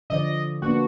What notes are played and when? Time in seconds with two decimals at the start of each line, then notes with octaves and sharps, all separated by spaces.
0.10 D3 F3 D5 D#5
0.62 A#3 B3 D4 F#4